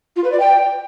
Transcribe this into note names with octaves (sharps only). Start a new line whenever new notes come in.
F4
B4
D5
G5